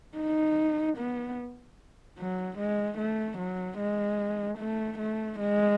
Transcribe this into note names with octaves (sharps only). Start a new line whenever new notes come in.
D#4
B3
F#3
G#3
A3
F#3
G#3
A3
A3
G#3